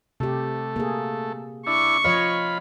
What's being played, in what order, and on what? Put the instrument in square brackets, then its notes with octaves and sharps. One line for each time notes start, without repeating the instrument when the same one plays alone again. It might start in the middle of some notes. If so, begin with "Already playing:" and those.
[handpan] C3 G4 [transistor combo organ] A3
[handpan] A#3 G#4
[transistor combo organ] D4 E4 [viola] C#6
[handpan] F3 C#5 D#5 [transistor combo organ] F4 B5